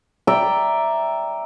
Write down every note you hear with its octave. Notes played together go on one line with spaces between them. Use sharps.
D5 E5 G5 A#5